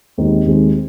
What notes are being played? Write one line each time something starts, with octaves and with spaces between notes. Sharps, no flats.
D#2 D#3 G#3 C4
D#2 D#3 G#3 C4